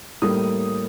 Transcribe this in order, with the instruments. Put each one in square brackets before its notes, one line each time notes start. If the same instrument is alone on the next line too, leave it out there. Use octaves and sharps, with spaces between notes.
[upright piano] A2 G3 A#3 D#6